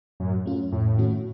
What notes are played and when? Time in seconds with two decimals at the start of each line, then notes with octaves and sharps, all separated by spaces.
0.20 F#2 A2
0.46 A3 C#4 F4
0.72 F2 A2
0.98 D#3 A3 C#4 F#4